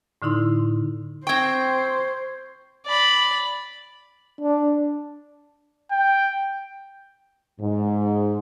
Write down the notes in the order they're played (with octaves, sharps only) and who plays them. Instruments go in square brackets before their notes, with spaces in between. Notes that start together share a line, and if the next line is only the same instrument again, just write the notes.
[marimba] A2 D3 D#4 E4 C6
[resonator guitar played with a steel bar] C4 G5 [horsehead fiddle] C5 [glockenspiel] C#6 G#6
[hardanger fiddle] D5 B5
[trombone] D4
[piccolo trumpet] G5
[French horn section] G#2